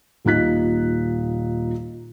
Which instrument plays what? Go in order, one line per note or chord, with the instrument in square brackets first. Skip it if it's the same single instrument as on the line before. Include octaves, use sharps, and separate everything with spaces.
[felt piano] D#1 A#2 D#4 F#6 B6